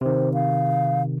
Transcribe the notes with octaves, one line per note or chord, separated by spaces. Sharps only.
C3 D#3 C5
F5